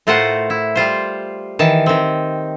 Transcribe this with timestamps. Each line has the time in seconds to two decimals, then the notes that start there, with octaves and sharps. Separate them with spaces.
0.07 A2 A3 F4 A#4 C5 F#5
0.50 E4
0.75 G3 F4 C5
1.59 D#3 E3 A5
1.86 D#3 C4